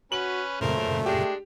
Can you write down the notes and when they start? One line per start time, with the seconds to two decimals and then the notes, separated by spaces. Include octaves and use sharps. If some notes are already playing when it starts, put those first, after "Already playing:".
0.12 C#4 F#4 B4 F#7
0.61 F#2 A#2 C#3 A3 A#4 C5
1.06 G#3 D4 G4